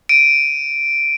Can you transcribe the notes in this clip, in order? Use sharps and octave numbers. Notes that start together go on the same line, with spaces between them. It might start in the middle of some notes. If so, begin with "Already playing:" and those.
D7 D#7